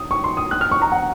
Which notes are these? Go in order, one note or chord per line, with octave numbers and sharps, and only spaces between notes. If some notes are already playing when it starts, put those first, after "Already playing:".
Already playing: D#6
C#6
C6
D#6
F#6
F6
C#6
A#5
F#5